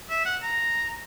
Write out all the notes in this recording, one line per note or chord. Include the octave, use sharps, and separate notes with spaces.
E5
F#5
A#5